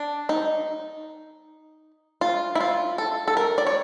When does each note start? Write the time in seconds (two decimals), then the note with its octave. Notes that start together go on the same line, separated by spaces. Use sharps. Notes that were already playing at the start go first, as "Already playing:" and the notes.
Already playing: D4
0.29 D#4
2.21 F4
2.55 E4
2.60 F4
2.98 A4
3.28 A4
3.37 A#4
3.58 D5
3.67 C#5